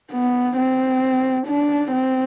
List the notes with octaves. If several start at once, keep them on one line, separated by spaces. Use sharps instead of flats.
B3
C4
D4
C4